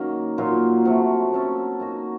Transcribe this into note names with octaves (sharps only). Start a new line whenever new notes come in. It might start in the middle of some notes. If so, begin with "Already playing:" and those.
Already playing: D#3 F#3 A#3 C#4 D#4
A#2 F#3 A#3 F4
C3 F#3 A3
A#3 C#4 A4
A#3 D#4 F#4